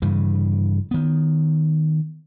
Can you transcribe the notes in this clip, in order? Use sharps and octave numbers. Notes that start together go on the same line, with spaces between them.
G2 C#3 E3
D#3 B3